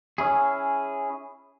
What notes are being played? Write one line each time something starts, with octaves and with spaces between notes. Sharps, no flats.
C#4 E4 G#4